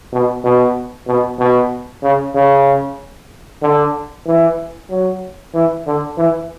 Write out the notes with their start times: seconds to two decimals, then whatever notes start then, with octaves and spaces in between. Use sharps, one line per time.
0.12 B2
0.44 B2
1.07 B2
1.39 B2
2.03 C#3
2.35 C#3
3.62 D3
4.27 E3
4.90 F#3
5.54 E3
5.87 D3
6.18 E3